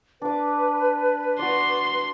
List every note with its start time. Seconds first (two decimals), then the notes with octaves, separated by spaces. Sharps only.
0.22 D4 B4 D6
1.39 F#4 D5 C6